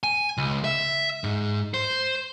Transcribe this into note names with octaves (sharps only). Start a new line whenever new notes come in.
G#5
C#2
E5
G#2
C5